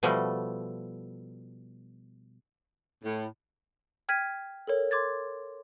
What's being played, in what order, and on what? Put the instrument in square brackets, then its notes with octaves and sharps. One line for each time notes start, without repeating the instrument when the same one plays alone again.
[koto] B2 F3 G3 A3
[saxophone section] A2
[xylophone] G5 F6 G#6 B6 D#7
A4 A#4 C#5
C6 D6 G#6 A6